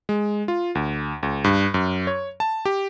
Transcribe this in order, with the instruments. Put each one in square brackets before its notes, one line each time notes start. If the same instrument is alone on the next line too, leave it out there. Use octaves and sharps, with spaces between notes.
[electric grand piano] G#3
F4
D2
C#2
G2
F#2
C#5
A5
G4